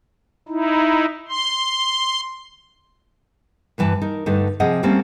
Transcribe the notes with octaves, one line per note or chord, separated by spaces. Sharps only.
D#4 E4
C6
D2 G2 E3 A5
D#4 A#4
G2 D3 A3 D#4
C3 F3 C4 G#4 D#5 F#5
G3 A3 A#3 C4 C#4